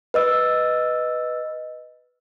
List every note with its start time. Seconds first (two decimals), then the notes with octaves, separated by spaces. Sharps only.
0.14 B4 D#5 E6